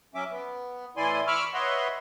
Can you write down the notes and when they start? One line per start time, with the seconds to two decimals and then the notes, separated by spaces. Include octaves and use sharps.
0.15 F#3 C#4 E5 D6
0.30 B3
0.97 A2 E3 E4 D5 G#5 C6
1.27 B5 C#6 D6 E6 F6
1.54 B4 C#5 D#5 E5 F#5 C6